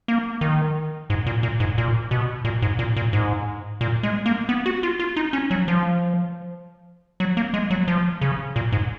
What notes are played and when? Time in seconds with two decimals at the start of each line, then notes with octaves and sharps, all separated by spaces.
0.08 A#3
0.41 D#3
1.10 G#2
1.26 A#2
1.43 A#2
1.60 G#2
1.78 A#2
2.11 B2
2.45 A#2
2.62 G#2
2.79 A#2
2.97 A#2
3.13 G#2
3.81 A#2
4.03 G#3
4.26 A#3
4.49 B3
4.66 F#4
4.83 F4
4.99 F4
5.16 D#4
5.33 C#4
5.51 F#3
5.68 F3
7.20 F#3
7.37 A#3
7.54 G#3
7.70 F#3
7.88 F3
8.21 C#3
8.56 A#2
8.72 G#2